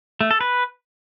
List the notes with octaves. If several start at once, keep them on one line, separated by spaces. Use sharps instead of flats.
A3
A4
B4